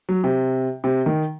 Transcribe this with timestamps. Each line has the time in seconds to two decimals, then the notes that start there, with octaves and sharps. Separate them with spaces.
0.09 F#3
0.24 C3
0.84 C3
1.06 D#3